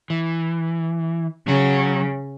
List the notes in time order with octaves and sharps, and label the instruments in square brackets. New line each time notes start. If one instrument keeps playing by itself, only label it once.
[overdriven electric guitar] E3
[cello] C#3 [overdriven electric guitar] F#3 C#5